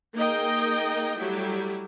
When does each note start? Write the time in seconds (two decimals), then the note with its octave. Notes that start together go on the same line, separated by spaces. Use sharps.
0.14 A#3 D#4 G#4 D#5 G5
1.19 F#3 G3 A3 E4